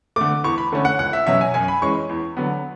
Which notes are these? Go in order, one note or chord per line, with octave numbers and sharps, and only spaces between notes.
D3 A3 D6
E2 C#6
B5
D3 A3 C#4
F#5
C#2 F#5
E5
B2 F#3 C#4 E5
G#5
F#2 G#5
B5
E3 G#3 C#4 C#6
E2
D3 F#3 B3